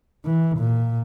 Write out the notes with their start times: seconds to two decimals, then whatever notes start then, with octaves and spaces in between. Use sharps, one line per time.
0.25 E3
0.58 A#2